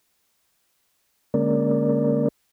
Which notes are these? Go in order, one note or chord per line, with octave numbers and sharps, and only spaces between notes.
D3 G#3 A#3 C#4 A#4 D5